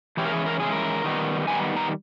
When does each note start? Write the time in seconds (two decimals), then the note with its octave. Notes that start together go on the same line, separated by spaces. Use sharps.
0.17 E3 G#3 C#4 E4 G4
0.25 A#4
0.32 G#4
0.46 A#4
0.60 E3 G#3 C#4 E4 G#4
0.72 A#4
1.04 D#3 G3 B3 D#4
1.48 D#3 G3 B3 D#4 G#5
1.77 A#5